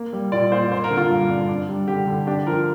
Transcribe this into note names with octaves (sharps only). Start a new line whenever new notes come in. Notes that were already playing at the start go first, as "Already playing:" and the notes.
Already playing: A#3
G3
A#2 D5
A#2 C5
A#3 C5
A#4
D3
F4
G2
D4
D4
G3
D3 G4
D3
D4 G4
F3 A#4